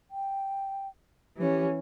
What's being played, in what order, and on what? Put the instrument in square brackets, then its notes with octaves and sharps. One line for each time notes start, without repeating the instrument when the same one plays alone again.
[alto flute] G5
[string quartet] E3 C#4 [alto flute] G4